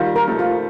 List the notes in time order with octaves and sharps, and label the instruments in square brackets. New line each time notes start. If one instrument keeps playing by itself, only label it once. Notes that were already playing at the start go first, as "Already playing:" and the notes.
Already playing: [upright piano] D#3 G3 [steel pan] F4
[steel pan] A#4
[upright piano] F3 A3
[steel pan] F4